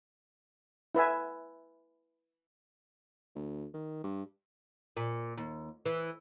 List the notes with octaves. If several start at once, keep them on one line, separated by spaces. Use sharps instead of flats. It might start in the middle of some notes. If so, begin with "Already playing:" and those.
E4 B4 E5 G#5
D2
D#3
G2
A#2
D#2
E3